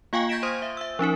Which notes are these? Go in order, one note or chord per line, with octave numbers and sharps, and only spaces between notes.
A#3 F4 F5 G5 G#5 C#6
G6 G#6 A#6 B6 D7 E7
C5 C6 D#6
E5
E5 E6
F3 C#4 D#4 A#4